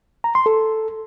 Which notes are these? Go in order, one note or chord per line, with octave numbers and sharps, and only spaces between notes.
A#5
C6
A4